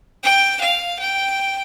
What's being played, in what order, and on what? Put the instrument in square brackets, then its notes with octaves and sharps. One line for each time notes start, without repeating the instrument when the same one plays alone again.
[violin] G5
F5
G5